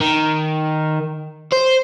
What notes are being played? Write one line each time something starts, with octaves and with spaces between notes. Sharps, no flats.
D#3
C5